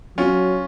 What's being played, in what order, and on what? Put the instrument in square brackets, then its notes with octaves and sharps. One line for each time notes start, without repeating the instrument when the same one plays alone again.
[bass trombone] F#3 [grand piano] C#4 F4